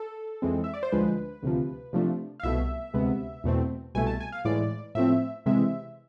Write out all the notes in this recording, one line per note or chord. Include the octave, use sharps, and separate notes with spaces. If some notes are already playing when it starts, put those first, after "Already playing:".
Already playing: A4
F2 E3 G#3 C4
E5
D5
C5
D2 D3 F3 G#3 B4
D2 C3 F3
C3 F3 A3 D4
F5
C2 B2 A3 E5
D2 C3 G#3 B3
E2 B2 A3 C4
C2 B2 A3 G#5
A5
G#5
F5
A2 E3 G#3 D5
A2 F3 A3 C4 E5
C3 E3 G#3 C4 E5